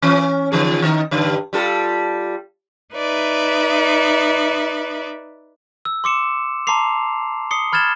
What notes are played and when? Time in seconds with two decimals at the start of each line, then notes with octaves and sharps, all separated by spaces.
0.02 E3 C#4
0.52 D3 F3 G#4
0.82 D#3 D#4
1.11 G2 D3
1.53 G3 F4 A4
2.95 D#4 B4 D5 E5
5.85 E6
6.04 C6 D6 C#7 E7
6.67 A5 A#5 C6 D6 C7 F7
7.51 D#6 C7 C#7 G7
7.72 B5 F6 G#6 A6 E7 G7